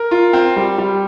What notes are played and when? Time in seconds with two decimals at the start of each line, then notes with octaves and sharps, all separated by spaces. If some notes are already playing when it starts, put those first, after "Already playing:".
Already playing: A#4
0.11 F4
0.33 C4
0.56 G3
0.78 G3